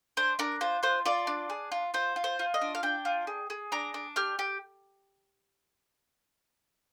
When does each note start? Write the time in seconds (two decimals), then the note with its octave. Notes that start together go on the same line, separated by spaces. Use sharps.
0.17 D4 C5
0.39 D4 A#4
0.61 F4 C5
0.83 F4 C5
1.05 F4 D5
1.27 D4
1.50 G#4
1.72 F4
1.94 F4 C5
2.16 F4
2.24 C5
2.39 F4
2.54 D#5
2.61 D4
2.75 F5
2.83 D4 G5
3.05 F4
3.27 G#4
3.50 G#4
3.72 D4 A#5
3.94 D4
4.16 G4 F6
4.39 G4